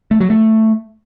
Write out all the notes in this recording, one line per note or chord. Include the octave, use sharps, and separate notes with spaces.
A3
F#3
A3